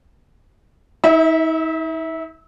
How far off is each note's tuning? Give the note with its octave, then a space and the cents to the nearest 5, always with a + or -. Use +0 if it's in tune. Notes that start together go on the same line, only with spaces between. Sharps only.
D#4 +45 E5 -20